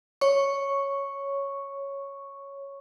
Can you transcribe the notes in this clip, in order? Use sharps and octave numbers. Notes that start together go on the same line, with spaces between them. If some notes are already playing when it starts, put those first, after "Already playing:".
C#5 C#6